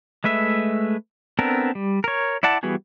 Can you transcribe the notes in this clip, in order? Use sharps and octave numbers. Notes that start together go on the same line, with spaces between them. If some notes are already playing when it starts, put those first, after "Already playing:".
G#3 A3 B4 E5
B3 C4 D4 A4 A#4
G3
A#4 C#5
E4 D5 F#5 A5
E3 G3 B3 F#4 G#4